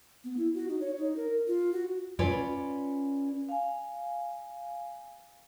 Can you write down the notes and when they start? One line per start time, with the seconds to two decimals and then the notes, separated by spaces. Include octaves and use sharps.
0.24 B3
0.37 E4
0.54 F#4
0.68 D#4
0.81 C#5
0.97 D#4
1.16 A#4
1.47 F4
1.73 F#4
2.19 C#4 F4 B4 C#5 D5
3.49 F5 G#5